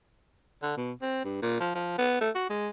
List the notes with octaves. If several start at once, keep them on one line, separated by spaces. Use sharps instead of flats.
D3
B2
C4
G2
A#2
F3
F3
B3
A3
F#4
G#3